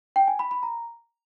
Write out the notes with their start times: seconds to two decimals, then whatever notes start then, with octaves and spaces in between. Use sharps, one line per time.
0.16 G5
0.28 G#5
0.39 B5
0.51 B5
0.63 A#5